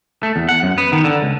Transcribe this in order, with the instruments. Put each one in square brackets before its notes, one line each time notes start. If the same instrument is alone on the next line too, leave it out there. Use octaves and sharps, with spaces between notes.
[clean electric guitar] A3
E2
F#5
F#2
B3
D#3
D3
C#2